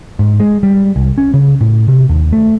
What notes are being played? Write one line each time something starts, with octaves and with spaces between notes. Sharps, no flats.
G#2
G#3
G3
C2
C#4
C#3
A2
C3
D#2
A3